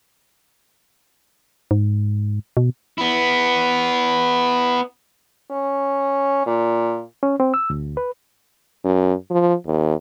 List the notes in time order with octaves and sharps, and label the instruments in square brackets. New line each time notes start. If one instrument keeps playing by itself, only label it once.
[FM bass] G#2
B2
[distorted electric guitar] B3 E4
[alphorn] C#4
A#2
[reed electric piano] C#4
C4
E6
D2
B4
[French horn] F#2
F3
D#2